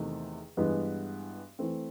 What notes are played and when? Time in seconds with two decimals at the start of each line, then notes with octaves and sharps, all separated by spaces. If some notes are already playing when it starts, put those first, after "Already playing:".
Already playing: E2 C3 D#3 A3
0.57 G2 E3 G#3 B3
1.59 E3 A3 C4